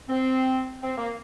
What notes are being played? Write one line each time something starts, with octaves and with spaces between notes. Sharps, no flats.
C4
C4
A#3